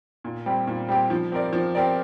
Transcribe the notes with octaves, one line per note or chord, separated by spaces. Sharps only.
A#2
G3 C4 G4
A#2
G3 C4 G4
F3
C4 G4 A#4 D5
F3
C4 G4 A#4 D5